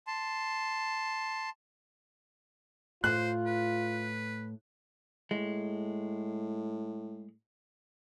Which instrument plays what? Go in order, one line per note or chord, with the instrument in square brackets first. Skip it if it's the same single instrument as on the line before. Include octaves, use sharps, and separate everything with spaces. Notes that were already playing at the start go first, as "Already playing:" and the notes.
[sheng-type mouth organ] A5 C6
[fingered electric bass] A2 [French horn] F4 [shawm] C5 [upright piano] F#6
[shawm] B4
[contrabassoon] A2 [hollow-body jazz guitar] G#3